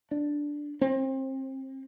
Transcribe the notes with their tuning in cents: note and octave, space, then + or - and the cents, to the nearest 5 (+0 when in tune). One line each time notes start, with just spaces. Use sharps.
D4 +0
C4 +30